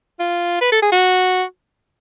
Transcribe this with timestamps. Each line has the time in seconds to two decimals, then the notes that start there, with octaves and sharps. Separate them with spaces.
0.20 F4
0.61 B4
0.72 A4
0.82 G#4
0.92 F#4